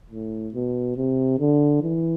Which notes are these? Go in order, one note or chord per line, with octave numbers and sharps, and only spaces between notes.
A2
B2
C3
D3
E3